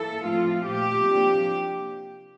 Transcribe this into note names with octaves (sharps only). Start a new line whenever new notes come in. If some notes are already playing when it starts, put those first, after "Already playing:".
Already playing: E3 A#3 E4 A4
A2 F3 A3 C4 F4
A#2 F3 A3 G4
C3 F3 A#3 D4